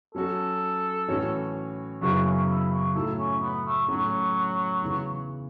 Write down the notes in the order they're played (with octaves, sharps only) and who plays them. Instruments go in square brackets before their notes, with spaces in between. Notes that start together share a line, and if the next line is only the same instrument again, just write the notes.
[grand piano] F#3 C#4 F#4 [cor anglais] A4
[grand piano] A2 E3 C#4 F#4 C#5
[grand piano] F#2 C#3 F#3 B3 E4 [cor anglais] F#4
[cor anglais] C#4
E4
F#4
[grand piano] A2 F#3 A3 E4 [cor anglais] A4
[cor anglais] C#4
B3
A3
[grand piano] A2 A3 C#4 [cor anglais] F#3
[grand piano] E2 C#3 E3